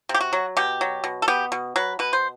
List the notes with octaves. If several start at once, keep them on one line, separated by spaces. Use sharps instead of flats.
C3
G4
F#4
F#3
B2 G4
F#3
B2
A4
B3 G4
B2
F#3 B4
B2 B4
C5